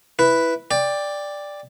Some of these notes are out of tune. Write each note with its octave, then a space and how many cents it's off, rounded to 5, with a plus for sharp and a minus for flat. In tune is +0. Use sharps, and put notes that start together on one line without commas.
E4 +0 B4 +0
D5 +0 G5 +20